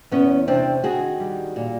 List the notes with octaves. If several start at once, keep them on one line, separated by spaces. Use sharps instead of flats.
E2 B3 C#4
C3 C4 D4
D#3 F#4 G#4
G3
A#2